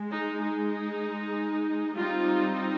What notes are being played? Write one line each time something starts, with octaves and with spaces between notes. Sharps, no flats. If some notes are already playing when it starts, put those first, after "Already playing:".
Already playing: G#3
D#4
D#4
G3 C4 D#4 F4